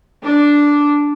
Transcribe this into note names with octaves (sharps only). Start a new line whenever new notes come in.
D4